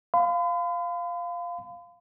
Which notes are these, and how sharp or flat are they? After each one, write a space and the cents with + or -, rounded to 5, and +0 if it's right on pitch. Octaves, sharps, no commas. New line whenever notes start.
F5 +0 B5 +45